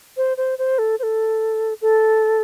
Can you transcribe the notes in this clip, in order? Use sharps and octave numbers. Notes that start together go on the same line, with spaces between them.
C5
C5
C5
A4
C5
A4
A4